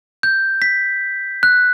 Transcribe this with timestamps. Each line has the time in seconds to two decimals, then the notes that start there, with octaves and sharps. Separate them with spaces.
0.23 G6
0.62 B6
1.43 F#6